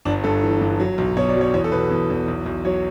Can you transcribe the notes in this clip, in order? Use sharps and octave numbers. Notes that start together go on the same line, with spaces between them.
G1 D4
G2 A4
E3
G2
F#3
B1
B2 C#5
D5
F#3
C#5
E2 C#5
A4
B2 B4
E2
E2
B1
B1
F#3 C#5